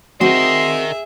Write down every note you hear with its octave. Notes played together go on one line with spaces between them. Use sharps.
C4 F#4 G#4 A#4 D#5 E5 C6